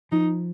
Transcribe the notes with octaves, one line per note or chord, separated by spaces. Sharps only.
F3 D#4